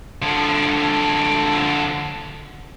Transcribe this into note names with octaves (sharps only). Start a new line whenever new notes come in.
D3 F3